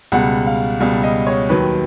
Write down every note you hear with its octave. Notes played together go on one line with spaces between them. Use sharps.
C#2 B2 G3 F#5
F5
C#2 B2 G3 F5
D#5
C#5
D#2 D#3 F#3 B4